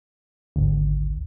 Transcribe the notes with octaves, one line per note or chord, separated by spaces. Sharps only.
G#1 D2